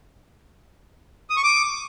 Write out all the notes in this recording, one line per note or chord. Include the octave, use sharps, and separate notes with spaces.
D#6
C#6
D6